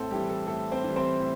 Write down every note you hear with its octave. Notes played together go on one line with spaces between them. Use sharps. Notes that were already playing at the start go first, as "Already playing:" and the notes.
Already playing: A2 C4 A4 C5
E3 G3 G4
A4
A2 A4
C4 C5
E3 G3
C4 C5
A2